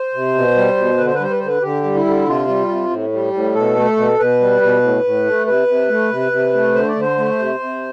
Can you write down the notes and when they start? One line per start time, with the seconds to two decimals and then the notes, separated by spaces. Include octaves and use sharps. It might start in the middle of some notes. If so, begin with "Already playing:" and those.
Already playing: C5
0.14 C3
0.35 B2
0.56 G3
0.77 B2
0.98 D3 B4
1.06 C5
1.15 B4
1.20 G3 C5
1.31 B4
1.40 D3 C5
1.47 B4
1.62 D3 G4
1.84 G3
1.95 E4
2.05 D3
2.26 C3 F4
2.47 G3
2.69 C3
2.90 A2
3.13 G3
3.33 A2
3.54 B2 A4
3.76 A3
3.97 B2
4.19 B2 B4
4.40 G3
4.62 B2
4.82 A2
5.04 A2
5.25 A3
5.46 C3 B4
5.68 C3
5.89 A3
6.11 C3
6.32 C3
6.54 A3
6.75 D3 C5
6.88 D5
6.96 D3 C5
7.18 A3
7.39 C3
7.60 C3